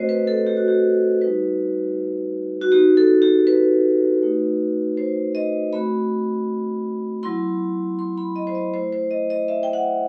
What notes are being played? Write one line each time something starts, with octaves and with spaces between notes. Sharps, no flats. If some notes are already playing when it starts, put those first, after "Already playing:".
Already playing: A3 C4 F#4 C5 D#5
B4
A4
G4
F#4
G4
G3 D#4 F#4 B4
F#4
B3 D#4 F#4 G4
A4
G4
B4
A3 D#4 F#4
C5
D#5
A3 C4 F#4 B5
F#3 B3 E4 C6
C6
B5
D#5
C5
D#5
A3 E4 C5
C5
D#5
D#5
E5
G5
F#5